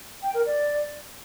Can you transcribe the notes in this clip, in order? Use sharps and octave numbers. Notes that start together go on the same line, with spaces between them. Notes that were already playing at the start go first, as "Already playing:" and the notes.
G5
A#4
D5